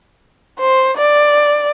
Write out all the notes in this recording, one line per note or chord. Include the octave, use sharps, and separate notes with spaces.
C5
D5